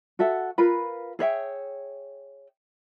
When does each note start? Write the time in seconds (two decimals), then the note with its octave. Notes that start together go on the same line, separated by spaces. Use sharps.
0.19 F#4 A4 E5 F#5
0.58 F4 A#4 B4 B5
1.19 G#4 C#5 E5 G5